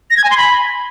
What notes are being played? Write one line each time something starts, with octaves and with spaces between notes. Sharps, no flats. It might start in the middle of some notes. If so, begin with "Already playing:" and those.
A#6
G#6
G#5
C6
B5